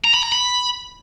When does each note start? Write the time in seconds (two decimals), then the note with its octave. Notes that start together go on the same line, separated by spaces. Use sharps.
0.04 A#5
0.14 B5
0.23 A#5
0.32 B5